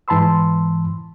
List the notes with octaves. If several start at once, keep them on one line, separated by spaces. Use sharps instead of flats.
G#2 E3 A5 B5 C6 E6